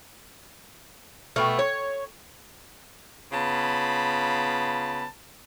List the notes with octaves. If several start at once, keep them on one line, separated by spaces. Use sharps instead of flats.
B2 A3 G5 C#6 F6
C#5
C#3 B3 F4 A5 B5